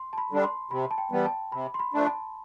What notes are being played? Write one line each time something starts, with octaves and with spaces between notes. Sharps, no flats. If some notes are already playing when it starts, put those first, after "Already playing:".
Already playing: C6
A5
B5
D3 G3 D4
C6
C3 B5
A5
G5
E3 G3 B3 G5
A5
C3 B5
C6
B5
F3 A3 D4
A5